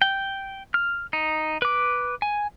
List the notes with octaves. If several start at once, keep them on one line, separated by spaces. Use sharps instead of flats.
G5
F6
D#4
B4 D6
G#5